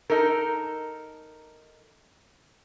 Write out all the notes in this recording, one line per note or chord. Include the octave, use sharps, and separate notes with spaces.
D#4 A4 A#4